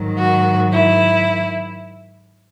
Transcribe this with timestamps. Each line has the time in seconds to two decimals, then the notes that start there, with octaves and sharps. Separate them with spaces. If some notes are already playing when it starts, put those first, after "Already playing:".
Already playing: G#2 D#3 F#3
0.18 F#4
0.72 E4